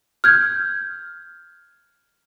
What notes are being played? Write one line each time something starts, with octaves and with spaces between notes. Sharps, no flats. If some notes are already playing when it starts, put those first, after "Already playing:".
F6 G6 G#6